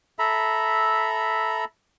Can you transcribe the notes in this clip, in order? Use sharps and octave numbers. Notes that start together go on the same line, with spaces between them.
A4 E5 A#5 B5